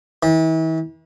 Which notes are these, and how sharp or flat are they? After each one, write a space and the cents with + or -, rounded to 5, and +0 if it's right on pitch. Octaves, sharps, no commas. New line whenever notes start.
E3 -40